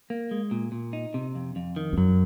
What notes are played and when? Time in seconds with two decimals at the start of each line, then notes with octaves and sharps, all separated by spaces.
0.10 A#3
0.31 G#3
0.51 A#2
0.72 A#2
0.93 D#4
1.14 C3
1.35 F2
1.56 F2
1.76 D#3
1.93 F2
1.98 F#2 F#3